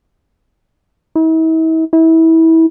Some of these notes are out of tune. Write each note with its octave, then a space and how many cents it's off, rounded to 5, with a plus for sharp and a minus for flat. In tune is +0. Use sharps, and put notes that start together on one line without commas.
E4 -45
E4 -25